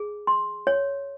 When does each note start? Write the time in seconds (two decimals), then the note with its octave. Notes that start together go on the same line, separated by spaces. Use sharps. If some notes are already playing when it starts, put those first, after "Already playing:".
Already playing: G#4
0.27 C6
0.67 C#5